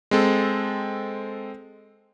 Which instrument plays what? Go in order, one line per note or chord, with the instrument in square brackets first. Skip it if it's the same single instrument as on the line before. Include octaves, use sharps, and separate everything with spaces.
[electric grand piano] G#3 C4 A4